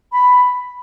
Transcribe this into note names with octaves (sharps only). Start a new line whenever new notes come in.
B5